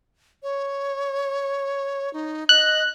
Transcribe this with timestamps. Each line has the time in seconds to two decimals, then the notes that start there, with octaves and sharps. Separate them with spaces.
0.43 C#5
2.13 D#4
2.49 D#5 F#6